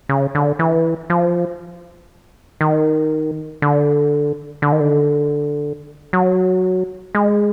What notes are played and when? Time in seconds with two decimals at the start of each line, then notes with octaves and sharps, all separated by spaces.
0.09 C#3
0.35 D3
0.59 E3
1.10 F3
2.61 D#3
3.62 D3
4.62 D3
4.72 D#3
4.80 D3
6.13 F#3
7.15 G#3